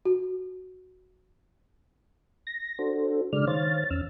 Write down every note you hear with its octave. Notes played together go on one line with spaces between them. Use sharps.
F#4
A#6
D4 F#4 A4 C5
C#3 G#3 D4 D5 F6
D#3 C5 C#5 F5 A6
E2 C#4 E6 F6